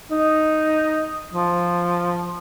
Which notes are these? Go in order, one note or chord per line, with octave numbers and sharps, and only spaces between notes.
D#4
F3